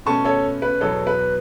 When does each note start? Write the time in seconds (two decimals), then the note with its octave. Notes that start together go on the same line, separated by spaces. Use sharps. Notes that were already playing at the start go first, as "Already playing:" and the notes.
0.06 B2 A3 C#4 A5 C#6
0.25 A4 C#5
0.62 B4
0.81 E2 B2 F#3 B3 A4 C#5
1.07 B4